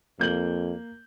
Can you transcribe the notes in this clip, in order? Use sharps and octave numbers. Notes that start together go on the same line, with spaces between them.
F2 A#3 G6 F#7